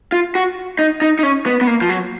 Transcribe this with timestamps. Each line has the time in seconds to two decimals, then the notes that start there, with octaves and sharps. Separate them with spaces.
0.12 F4
0.35 F#4
0.79 D#4
1.02 D#4
1.19 D#4
1.23 C#4
1.46 B3
1.61 B3
1.67 A#3
1.81 F3
1.89 F#3